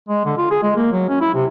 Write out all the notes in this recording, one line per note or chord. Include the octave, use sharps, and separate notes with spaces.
G#3
D3
F4
G#4
G#3
A#3
F#3
C#4
E4
C3